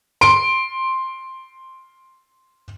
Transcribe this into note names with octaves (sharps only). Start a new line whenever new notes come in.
C6 D7